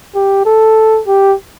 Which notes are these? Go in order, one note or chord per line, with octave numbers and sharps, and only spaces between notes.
G4
A4
G4